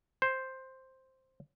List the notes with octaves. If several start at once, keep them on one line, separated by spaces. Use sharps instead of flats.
C5